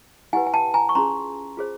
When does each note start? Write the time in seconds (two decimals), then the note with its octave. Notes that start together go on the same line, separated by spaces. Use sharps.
0.33 E4 G4 B4 F#5 G#5
0.46 G#5
0.54 G5 A5
0.74 G#5 A#5
0.89 C#6
0.95 C#4 F4 G#4 A#5 C6
1.57 F4 G#4 C5